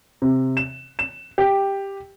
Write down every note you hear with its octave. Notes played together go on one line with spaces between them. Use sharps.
C3
E7
E7
G4